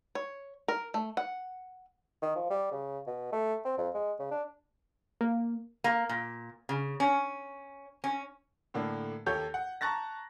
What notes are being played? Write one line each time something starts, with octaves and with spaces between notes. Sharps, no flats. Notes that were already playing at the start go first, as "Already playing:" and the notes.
C#5
A#4
A3
F#5
D#3
F3
G3
C#3
B2
A3
C4
F2
G#3
C#3
D4
A#3
A#3
A#2
C#3
C#4
C#4
A2 D3 A#3 D4
D#2 G4 A4 C#5 G6
F#5
A5 A#5 C#6 F#6 A6 A#6